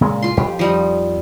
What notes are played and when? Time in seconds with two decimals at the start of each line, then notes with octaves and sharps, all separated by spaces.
0.01 A#2 C#3 G#3
0.22 F4 C6
0.37 F2 G4
0.59 F3 G3 D#4